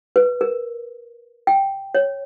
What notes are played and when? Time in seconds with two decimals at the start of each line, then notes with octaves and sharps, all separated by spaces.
0.16 B4
0.41 A#4
1.47 G5
1.95 C#5